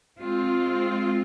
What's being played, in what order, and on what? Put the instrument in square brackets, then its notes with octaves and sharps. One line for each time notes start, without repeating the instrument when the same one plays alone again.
[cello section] G#3 C4 F4